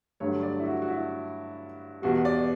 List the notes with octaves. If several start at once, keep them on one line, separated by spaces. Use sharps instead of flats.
G2 D3 F#3 A3 C#5
D5
E4
F#4
F#4
E4
E2 B2 G3 F#4
D5